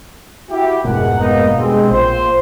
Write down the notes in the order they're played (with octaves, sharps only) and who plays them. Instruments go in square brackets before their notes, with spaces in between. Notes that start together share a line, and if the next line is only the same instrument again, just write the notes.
[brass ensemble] E4 F#4 G4
[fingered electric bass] F1 G#2 B2 [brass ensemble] G#3 A#4 F#5
[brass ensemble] A#3 B3 D#4
[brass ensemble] G2 G#3 C4 [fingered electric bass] B2
[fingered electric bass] A#1 [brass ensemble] F4 C5